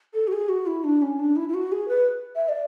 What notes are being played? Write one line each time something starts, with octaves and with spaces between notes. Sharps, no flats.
A4
F#4
G#4
F#4
E4
D4
C#4
D4
E4
E4
F#4
G#4
B4
E5
D5